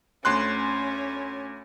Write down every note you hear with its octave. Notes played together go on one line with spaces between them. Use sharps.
D2 C#4 C6 F#6